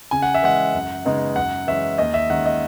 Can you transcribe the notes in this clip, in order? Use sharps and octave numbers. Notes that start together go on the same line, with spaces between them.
C#3 G#5
F#5
E5
E3 G#3 F#5
F#2
C#3 G#3 B3 D#4
F#2 F#5
E3 G#3 C#4 E5
D#2 D#5
E5
D#3 G#3 C#4 F#5
D#5